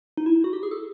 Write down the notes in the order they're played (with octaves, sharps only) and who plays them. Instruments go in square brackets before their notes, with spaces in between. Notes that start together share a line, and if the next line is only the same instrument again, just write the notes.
[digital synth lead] D#4
E4
F#4
G4
G#4
A4